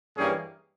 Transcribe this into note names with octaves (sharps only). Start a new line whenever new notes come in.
G2 E3 G3 A#3 C#4 G#4